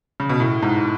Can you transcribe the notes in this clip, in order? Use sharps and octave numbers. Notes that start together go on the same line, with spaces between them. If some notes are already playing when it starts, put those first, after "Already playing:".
C#3
B2
A2
G#2